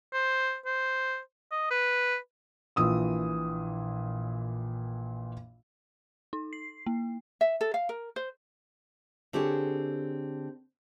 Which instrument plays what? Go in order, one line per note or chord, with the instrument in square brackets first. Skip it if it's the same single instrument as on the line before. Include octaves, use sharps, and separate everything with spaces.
[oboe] C5
C5
D#5
B4
[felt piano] A#1 A#2 E3 D#6 E6
[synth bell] D#4
C7
A#3
[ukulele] E5
A4
F5
A#4
C5
[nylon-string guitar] D3 C4 G4 G#4 C#5